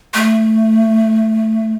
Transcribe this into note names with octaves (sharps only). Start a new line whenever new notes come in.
A3